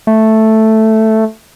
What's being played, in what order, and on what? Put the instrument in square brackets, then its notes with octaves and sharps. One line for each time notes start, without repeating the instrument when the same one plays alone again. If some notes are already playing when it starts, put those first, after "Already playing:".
[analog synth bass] A3